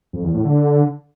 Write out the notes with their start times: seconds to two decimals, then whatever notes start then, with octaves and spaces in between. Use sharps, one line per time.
0.13 F2
0.24 E2
0.34 A2
0.45 D3